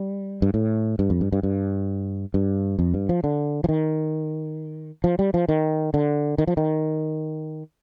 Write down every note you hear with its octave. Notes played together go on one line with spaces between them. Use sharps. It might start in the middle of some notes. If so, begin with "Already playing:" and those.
Already playing: G3
G2
A2
G2
F2
G2
G2
G2
G2
F2
G2
F3
D3
F3
D#3
F3
G3
F3
D#3
D3
D#3
F3
D#3